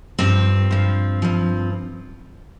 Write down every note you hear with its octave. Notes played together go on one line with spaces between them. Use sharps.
G2 F3 C4
G2 F3
G2 F3